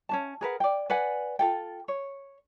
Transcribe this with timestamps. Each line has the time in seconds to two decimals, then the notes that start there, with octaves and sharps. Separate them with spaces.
0.09 C#4 D4 A5
0.41 G#4 A#4 B4 F#5
0.60 D5 G5
0.90 B4 D5 F#5 G#5
1.39 F4 A4 G5
1.88 C#5